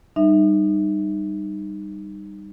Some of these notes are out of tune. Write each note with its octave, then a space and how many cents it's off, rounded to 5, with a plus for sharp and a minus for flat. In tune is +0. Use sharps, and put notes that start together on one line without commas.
G3 +0 D#4 -20 E5 -10